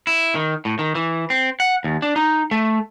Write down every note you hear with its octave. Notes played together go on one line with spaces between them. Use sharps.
E4
D#3
A2
D#3
E3
C4
F#5
D#2
D4
D#4
A3